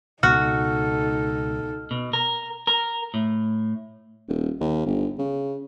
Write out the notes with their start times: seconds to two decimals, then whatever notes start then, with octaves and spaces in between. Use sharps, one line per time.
0.23 C#2 B2 B3 D#4 F#4 A4 F6
1.91 B2
2.13 A#4
2.67 A#4
3.14 A2
4.28 D#1
4.60 D#2
4.86 G1
5.19 C#3